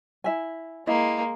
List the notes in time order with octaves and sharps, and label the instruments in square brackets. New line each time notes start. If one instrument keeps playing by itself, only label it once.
[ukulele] E4 E5 G#5
[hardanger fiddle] G#3 A#3 [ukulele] E4 D#5